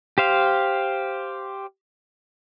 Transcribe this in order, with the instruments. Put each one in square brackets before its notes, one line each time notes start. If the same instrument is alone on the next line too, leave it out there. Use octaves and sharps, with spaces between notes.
[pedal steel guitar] G4 C5 F5